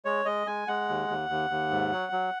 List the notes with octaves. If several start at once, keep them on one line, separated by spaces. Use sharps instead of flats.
G#3 C#5
G#3 D#5
G#3 G#5
G#3 F#5
D#2
D#2
D#2
D#2
G#2
F#3
F#3